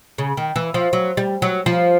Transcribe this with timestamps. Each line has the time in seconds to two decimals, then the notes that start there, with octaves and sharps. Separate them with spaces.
0.18 C#3
0.37 D#3
0.56 E3
0.74 F3
0.93 F#3
1.17 G3
1.42 F#3
1.66 F3